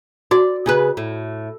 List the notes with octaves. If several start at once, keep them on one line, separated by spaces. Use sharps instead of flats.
F#4 D5
C#3 G#4 B4
A2